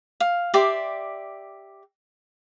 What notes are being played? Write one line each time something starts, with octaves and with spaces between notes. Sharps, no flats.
F5
G4 D5 E5 C6